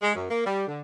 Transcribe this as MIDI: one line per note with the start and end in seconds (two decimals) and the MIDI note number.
0.03 0.14 56
0.15 0.25 42
0.30 0.42 58
0.46 0.66 55
0.67 0.81 50